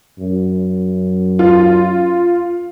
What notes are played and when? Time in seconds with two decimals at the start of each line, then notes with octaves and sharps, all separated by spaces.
0.19 F#2
1.39 F4